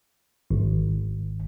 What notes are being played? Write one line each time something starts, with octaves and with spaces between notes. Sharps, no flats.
G#1